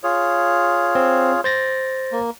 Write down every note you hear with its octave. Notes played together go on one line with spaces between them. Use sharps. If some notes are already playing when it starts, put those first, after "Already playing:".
F4 G#4 C#5
C4
C5 A6 A#6
A#3